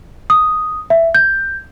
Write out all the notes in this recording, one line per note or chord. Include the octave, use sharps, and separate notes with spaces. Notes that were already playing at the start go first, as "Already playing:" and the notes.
D#6
E5
G6